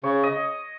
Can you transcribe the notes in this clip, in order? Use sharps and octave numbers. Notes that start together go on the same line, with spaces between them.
C#3 C#5
D#5